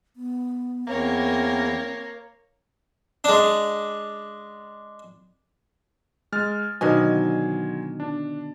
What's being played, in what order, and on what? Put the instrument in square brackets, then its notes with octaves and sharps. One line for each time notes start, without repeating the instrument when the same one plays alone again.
[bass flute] B3
[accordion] E2 [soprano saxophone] A#3 [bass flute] C4 [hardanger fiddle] A#4 C#5
[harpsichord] G#3 D4
[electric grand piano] G#3 F6 A6
[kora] B2 D3 D#3 [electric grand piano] F#3 C5 G#5
[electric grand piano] D4